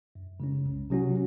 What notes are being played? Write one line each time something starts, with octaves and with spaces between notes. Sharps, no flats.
F#2
C#3 G#3 C#4
C2
C3 F#3 C#4 F#4